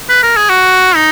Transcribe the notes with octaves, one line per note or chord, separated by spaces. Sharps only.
B4
A#4
G#4
F#4
D#4